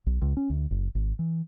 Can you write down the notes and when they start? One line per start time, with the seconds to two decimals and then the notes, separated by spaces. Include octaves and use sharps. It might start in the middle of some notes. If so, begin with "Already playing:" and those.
0.06 B1
0.22 C#2
0.37 C#4
0.50 D2
0.71 F#1
0.95 G#1
1.19 E3